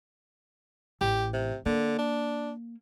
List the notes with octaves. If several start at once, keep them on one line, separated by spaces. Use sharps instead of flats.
A1 G4
C3
D3 A#3
D4